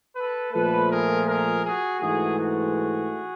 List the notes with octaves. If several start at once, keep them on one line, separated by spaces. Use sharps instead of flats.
A4 B4
A#2 F3 A3 A4 B4
G#4 A#4
G#4 A#4
F#4 G#4
G#2 E3 A3 F#4 G#4
F#4 G#4